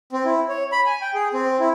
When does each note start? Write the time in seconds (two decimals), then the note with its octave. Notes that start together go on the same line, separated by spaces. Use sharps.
0.12 C4
0.25 E4
0.49 C#5
0.72 B5
0.86 G#5
1.01 G5
1.14 G#4
1.34 C4
1.60 E4